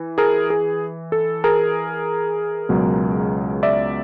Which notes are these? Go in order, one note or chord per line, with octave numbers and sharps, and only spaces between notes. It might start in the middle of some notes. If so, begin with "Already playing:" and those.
Already playing: E3
G#4 A#4
G#4
A4
G#4 A#4
C#2 B2 F#3
D5 E5